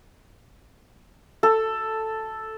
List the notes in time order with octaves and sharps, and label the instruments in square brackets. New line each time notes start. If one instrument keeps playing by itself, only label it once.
[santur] A4